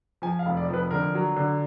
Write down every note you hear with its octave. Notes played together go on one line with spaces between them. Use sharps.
F3 G#5
F5
F1
D5
F3 B4
D3 A#4
F#3
D3